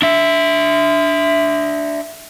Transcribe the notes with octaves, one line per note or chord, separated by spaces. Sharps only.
D4 E5